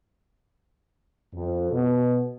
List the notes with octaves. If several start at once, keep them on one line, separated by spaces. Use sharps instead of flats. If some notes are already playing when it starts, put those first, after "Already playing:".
F2
B2